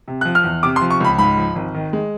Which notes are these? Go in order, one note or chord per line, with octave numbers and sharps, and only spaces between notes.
C3
F#6
F3
F6
E2
C3 D6
C6
F3
C#6
C#2 B5
G#2 B5
F3
G#1
D#3
G#3